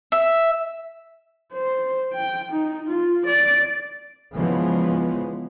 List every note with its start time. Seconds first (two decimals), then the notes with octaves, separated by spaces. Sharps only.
0.12 E5
1.53 C5
2.14 G5
2.52 D#4
2.89 F4
3.26 D5
4.34 C#3 E3 F3 G#3 B3